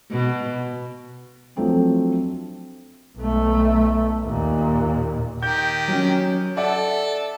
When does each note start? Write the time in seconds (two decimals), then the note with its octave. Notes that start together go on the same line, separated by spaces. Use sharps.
0.11 B2
1.56 F3 F#3 A3 C4 D4
3.18 B1 A3
4.24 D#2 A#2
5.43 D#3 G4 G6
5.88 F#3 C#4
6.57 A4 D5 E5 F#5